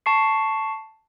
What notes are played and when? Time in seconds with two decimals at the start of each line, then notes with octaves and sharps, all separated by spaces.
0.06 A5 C#6 C7